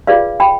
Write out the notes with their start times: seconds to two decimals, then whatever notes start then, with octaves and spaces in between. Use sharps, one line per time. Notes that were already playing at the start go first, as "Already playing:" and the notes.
0.07 F4 G#4 B4 D5 F5
0.40 G5 B5